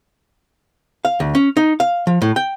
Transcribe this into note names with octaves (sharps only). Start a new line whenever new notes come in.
F5
D2
C#4
D#4
F5
F3
A2
G5